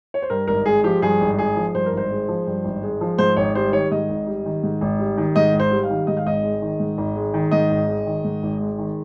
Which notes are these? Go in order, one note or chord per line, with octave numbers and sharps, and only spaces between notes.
C#5
C5
G2 A#4
G#1 A#4
G#3 G#4
F3 G4
G2 G#4
G#1
G#3 G#4
F3
G2 C5
A#4
G#1 C5
G#3
F3
G2
G#1
G#3
F3
G#2 C5
G#1 C#5
G3 C5
D#3 C#5
G#2 D#5
G#1
G3
D#3
G#2
G#1
G3
D#3
G#2 D#5
G#1
C5
G3
F5
D#3
G#2 D#5
F5
G#1 D#5
G#3
D#3
G#2
G#1
G#3
D#3
G#2 D#5
G#1
G#3
D#3
G#2
G#1
G#3
D#3